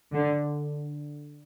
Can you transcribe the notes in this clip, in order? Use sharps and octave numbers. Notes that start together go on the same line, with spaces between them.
D3